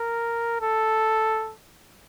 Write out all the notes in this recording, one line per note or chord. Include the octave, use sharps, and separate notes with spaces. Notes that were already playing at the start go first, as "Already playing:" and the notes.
Already playing: A#4
A4